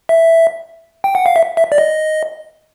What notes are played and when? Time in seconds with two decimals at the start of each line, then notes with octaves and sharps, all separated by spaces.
0.09 E5
1.04 G5
1.15 F#5
1.26 F5
1.36 E5
1.57 E5
1.72 D5
1.78 D#5